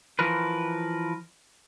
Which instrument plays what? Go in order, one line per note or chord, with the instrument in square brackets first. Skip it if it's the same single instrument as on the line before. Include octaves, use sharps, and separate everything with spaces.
[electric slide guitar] E3 F3 A#4 B4